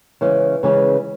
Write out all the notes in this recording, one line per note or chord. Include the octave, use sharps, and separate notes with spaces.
C#3 E3 G#3 C#4
C#3 E3 G#3 C#4